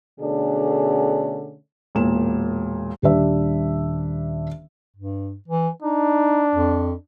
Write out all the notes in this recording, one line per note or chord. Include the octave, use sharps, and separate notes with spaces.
B2 D3 A3 C#4 D4 G#4
E1 A#2 E7
D#1 G3 D4 E5
G2
E3
D4 D#4
F2